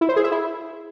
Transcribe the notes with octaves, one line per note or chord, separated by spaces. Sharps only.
E4
C5
G#4
E5
E4